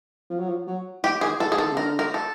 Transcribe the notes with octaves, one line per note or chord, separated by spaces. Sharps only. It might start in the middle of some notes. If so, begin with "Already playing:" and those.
F3
F#3
F3
F#3
E3 G4
D#3 G#4
E3 A4
G#4
D#3 A4
C#3
D3 A#4
A#4
A4